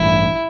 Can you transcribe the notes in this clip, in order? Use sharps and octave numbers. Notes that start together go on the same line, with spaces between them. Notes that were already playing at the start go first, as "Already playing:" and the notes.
Already playing: A1 G2 E3 E4